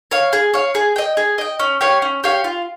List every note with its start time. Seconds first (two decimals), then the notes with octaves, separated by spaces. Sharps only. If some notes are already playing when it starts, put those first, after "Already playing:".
0.11 C#5 F5
0.33 G#4
0.54 C#5 F5
0.75 G#4
0.96 D#5 G5
1.17 G#4
1.38 D#5 G5
1.60 C#4
1.81 G4 C#5 F5
2.02 C#4
2.24 G4 C#5 F5
2.44 F4